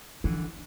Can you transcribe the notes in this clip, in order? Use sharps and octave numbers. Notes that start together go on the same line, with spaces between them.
D3 E3 F3